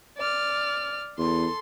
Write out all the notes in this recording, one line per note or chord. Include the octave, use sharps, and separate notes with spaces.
D5 F6
E2 A4 C6